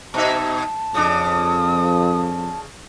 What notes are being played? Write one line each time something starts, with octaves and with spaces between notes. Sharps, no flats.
B2 D#4 E5 A5
F2 C#3 D4 D#6